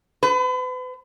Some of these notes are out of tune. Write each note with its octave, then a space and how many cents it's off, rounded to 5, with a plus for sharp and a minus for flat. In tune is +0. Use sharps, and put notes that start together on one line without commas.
B4 +40